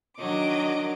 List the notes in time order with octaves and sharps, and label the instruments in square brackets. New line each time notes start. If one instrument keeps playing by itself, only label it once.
[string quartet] D#3 D#5 D6 [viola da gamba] F#3 D4